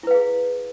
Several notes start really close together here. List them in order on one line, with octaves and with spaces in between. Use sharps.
E4 B4 F5 G#4